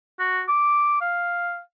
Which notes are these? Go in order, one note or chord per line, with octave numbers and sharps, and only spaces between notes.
F#4
D6
F5